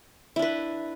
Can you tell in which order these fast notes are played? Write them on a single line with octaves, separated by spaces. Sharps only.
E4 D4 B4